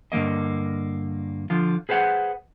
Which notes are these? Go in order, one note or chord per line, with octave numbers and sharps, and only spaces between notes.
G2 D3 G3 A#3 D#5
D3 F3 F4
G#4 B4 C5 F5 F#5